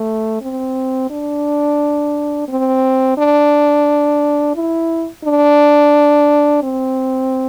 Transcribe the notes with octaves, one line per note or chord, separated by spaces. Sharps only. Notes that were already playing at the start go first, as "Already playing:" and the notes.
Already playing: A3
C4
D4
C4
D4
E4
D4
C4